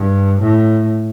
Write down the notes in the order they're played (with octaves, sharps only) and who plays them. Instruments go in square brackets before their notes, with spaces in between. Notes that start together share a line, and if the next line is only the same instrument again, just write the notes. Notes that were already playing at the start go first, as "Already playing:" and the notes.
Already playing: [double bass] G2
A2